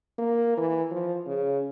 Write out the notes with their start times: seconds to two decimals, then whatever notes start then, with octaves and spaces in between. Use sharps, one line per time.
0.19 A#3
0.57 E3
0.91 F3
1.27 C#3